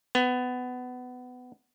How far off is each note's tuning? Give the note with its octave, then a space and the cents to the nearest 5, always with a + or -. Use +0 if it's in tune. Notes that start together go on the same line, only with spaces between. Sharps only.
B3 +20